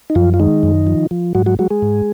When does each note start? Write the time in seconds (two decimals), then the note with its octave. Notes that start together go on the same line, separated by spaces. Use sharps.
0.10 D#4
0.15 F#2 F3 F4
0.34 F4
0.40 D#3 G#3 D#4
0.63 F#2
0.87 F3
1.11 F3
1.35 G#2 F#3 F#4
1.46 F#3 F#4
1.59 F#3 G#3 F#4
1.70 G#3 G#4
1.82 G#2